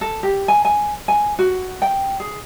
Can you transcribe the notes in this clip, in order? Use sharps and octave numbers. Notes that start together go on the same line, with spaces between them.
A4
G4
G#5
G#5
G#5
F#4
G5
G#4